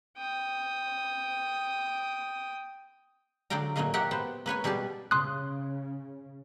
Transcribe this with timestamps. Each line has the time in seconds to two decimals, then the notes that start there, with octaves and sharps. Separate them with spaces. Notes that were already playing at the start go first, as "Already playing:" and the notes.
0.17 G5 D#6
3.50 D3 F#3 D5 F5 G5 A#5
3.76 A#2 F#3 A3 A#3 D#5 F5
3.94 G4 A#4 C#5 E5 F#5 G5
4.11 B3 C5
4.46 A#3 B4 C#5 G#5
4.64 B2 G3 G4 G#4 A5
5.11 C#3 C6 D#6 F#6